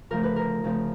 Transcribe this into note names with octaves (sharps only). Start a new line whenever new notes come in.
D2 C#3 F3 A3 C4 A#4
B4
A#4
D2 C#3 F3 A3 C4